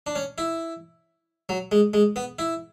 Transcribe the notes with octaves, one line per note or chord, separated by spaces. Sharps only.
D4
C#4
E4
F#3
G#3
G#3
B3
E4